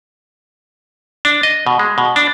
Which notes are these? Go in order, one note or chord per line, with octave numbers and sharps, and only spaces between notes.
D4
D#5
B2
G#3
B2
D4